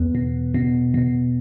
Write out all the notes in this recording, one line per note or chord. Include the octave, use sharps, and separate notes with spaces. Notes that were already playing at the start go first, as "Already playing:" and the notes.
Already playing: E2 B3
B2
B2
B2